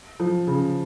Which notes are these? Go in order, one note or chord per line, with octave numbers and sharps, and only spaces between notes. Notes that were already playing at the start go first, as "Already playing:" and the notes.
F3
C#3